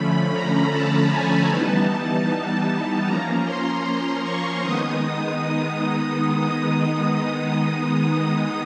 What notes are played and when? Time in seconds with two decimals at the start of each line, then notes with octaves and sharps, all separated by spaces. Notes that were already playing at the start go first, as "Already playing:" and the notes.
Already playing: D3 F3 A3 C#4 B5
0.31 A#5
0.70 A5
1.10 G#5
1.48 E3 G3 B3 D#4 A5
3.05 F3 A#3 C#4 A#5
3.44 C6
3.84 C6
4.23 C#6
4.62 D#3 G#3 B3 D#4 D#6